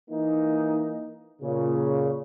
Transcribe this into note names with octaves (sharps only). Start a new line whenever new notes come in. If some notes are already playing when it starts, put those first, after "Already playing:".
E3 A#3 D#4
A#2 C#3